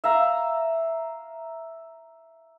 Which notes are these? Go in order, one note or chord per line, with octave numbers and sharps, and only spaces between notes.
E5 F5 A#5